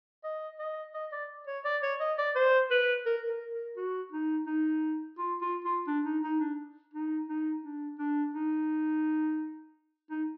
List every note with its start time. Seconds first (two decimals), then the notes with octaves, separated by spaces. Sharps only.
0.24 D#5
0.59 D#5
0.94 D#5
1.12 D5
1.47 C#5
1.65 D5
1.83 C#5
2.00 D#5
2.18 D5
2.35 C5
2.71 B4
3.06 A#4
3.29 A#4
3.53 A#4
3.77 F#4
4.12 D#4
4.47 D#4
5.18 F4
5.41 F4
5.64 F4
5.87 D4
6.05 D#4
6.23 D#4
6.40 D4
6.94 D#4
7.28 D#4
7.63 D4
7.99 D4
8.34 D#4
10.10 D#4